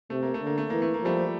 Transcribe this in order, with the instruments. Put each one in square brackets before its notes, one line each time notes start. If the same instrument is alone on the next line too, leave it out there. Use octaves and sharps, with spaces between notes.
[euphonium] C3 [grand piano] A3
[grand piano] A#3
A3
[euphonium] D3
[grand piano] A#3
A3
[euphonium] E3 [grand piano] A#3
[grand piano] A3
A#3
[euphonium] F3 [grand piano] G3 A3